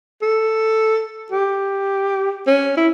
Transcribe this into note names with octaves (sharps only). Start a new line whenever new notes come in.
A4
G4
C#4
E4